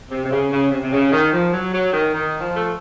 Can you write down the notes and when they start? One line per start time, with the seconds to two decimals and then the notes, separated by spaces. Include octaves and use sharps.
0.11 C3
0.25 C3
0.31 C#3
0.52 C#3
0.71 C3
0.83 C3
0.92 C#3
1.12 D#3
1.33 F3
1.53 F#3
1.73 F#3
1.93 D#3
2.14 D#3
2.41 F3
2.56 A3